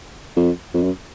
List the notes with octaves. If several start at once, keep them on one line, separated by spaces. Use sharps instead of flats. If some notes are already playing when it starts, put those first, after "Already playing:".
F2
F2
F#2